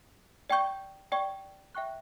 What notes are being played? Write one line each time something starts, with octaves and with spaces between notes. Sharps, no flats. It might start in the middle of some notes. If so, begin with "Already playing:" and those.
D5 G5 C#6 G6
D5 G5 C#6
E5 G5 C#6 F#6